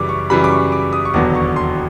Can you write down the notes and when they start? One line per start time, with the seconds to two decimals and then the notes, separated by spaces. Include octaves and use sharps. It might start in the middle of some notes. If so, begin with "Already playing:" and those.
Already playing: F#2 C#3 E3 G3 D6
0.09 C#6
0.30 F#2 C#3 E3 G3 B5
0.44 D6
0.52 C#6
0.72 D6
0.93 D#6
1.05 C#6
1.14 E1 D#2 D3 F#3 B3 D6
1.35 C#6
1.56 C6